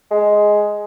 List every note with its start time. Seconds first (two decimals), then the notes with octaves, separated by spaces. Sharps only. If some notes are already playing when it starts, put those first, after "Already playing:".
0.11 G#3